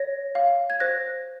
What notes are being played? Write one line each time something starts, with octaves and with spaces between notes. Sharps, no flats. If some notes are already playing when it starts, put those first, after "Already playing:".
Already playing: C#5 A#6
F5
G#6
C5 F#6 A#6